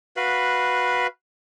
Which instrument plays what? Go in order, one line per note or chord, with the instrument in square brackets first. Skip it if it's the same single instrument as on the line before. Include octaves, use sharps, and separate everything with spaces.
[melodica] F#4 B4 F5 B5